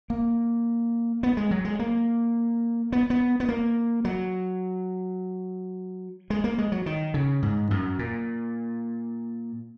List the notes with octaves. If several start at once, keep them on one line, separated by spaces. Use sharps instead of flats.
A#3
B3
G#3
F#3
G#3
A#3
B3
B3
B3
A#3
F#3
G#3
A#3
G#3
F#3
D#3
C#3
G#2
F#2
A#2